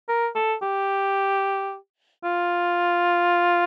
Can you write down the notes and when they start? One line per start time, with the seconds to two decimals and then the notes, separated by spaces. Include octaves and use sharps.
0.08 A#4
0.35 A4
0.62 G4
2.24 F4